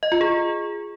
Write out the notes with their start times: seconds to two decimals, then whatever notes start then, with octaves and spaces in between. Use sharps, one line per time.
0.03 D#5
0.12 F4
0.21 G#4